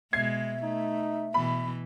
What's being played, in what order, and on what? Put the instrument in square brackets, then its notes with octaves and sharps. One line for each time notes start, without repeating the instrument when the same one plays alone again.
[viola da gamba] B2 G#3 [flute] E5 [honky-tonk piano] G#6 C7
[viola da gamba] A3 [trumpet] D#4
[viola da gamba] B2 E3 [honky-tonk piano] B5